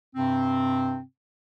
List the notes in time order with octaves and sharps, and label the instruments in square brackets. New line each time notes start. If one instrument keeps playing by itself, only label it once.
[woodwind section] G2 C3 C4